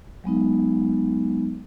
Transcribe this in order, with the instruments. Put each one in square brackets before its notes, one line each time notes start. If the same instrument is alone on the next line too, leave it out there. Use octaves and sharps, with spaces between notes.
[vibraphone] F#3 G#3 B3 D#4